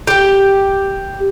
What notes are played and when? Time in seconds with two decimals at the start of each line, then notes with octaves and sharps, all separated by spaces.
0.07 G4 G5